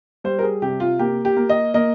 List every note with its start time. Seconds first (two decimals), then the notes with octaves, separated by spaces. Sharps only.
0.24 G3 C5
0.39 A#4
0.42 G#4
0.62 C3 G4
0.80 F4
0.99 A#3 G4
1.25 G4
1.37 A#3
1.49 D#5
1.74 A#3 D#5